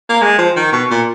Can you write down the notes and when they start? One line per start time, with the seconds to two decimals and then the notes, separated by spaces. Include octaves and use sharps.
0.09 A#3
0.22 G#3
0.39 F3
0.56 D#3
0.72 B2
0.91 A#2